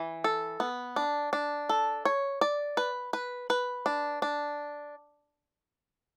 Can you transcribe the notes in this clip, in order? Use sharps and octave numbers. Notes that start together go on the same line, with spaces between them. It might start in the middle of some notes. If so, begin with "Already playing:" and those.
Already playing: E3
A4
B3
D4
D4
A4
C#5
D5
B4
B4
B4
D4
D4